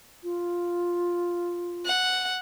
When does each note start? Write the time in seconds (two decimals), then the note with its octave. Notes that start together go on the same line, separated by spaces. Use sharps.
0.23 F4
1.85 F#5